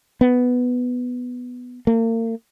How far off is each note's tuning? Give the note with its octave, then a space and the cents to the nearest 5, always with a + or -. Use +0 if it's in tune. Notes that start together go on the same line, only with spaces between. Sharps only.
B3 +5
A#3 -40